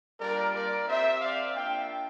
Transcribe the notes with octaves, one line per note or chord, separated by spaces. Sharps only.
G3 A#3 D4 F4 A#4 D5
A#4 D5
C4 G4 C5 E5
D5 F5
A#3 D4 F4 E5 G5